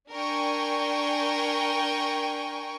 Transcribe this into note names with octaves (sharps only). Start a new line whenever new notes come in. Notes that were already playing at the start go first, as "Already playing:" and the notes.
D4 A#4 G5 G#5 C#6